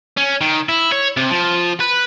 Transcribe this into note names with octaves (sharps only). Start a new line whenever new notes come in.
C#4
D#3
E4
C#5
C3
F3
B4